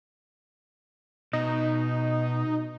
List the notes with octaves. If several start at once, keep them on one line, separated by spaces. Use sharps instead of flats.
B2 D#4